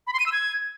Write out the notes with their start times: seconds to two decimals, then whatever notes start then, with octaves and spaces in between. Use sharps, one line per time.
0.07 B5
0.13 C6
0.20 D#7
0.26 E6
0.32 G#6